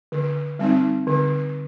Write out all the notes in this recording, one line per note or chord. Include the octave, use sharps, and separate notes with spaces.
D3
G3 C4 D#4
D3